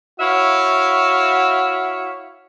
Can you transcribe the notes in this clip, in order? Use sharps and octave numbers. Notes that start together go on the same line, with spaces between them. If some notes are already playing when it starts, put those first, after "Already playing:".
E4 F#4 C#5 E5 F5